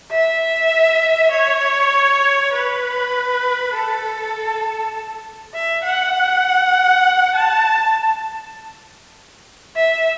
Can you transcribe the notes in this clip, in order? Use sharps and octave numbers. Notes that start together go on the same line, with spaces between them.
E5
C#5
B4
A4
E5
F#5
A5
E5